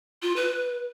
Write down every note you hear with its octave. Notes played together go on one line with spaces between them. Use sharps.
F4
B4